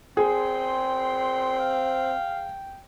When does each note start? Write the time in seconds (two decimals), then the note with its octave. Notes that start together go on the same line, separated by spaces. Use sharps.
0.17 A#2 B3 C4 G#4 G5 C6
1.59 F5